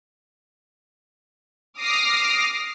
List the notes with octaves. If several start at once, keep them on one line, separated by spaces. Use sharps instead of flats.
D6 D#6 F6 A#6 C7